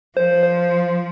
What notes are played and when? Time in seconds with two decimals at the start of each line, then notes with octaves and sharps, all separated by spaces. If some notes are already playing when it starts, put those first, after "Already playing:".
0.17 F3 C5
0.43 C5